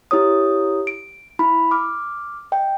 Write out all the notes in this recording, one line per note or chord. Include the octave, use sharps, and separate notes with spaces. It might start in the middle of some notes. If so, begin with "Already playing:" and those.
E4 G4 C#5 D#6
D7
E4 B5
D6 F6
D#5 G5